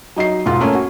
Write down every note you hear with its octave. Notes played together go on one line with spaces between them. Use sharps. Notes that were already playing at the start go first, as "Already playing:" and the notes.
F#3 D#4 D#5 C7
E1 G#2 F4 C6
A3 A#3 C#4
F#4